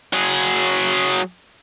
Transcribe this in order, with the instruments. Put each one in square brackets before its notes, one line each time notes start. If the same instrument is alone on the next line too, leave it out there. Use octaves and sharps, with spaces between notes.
[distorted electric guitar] F#3 G#4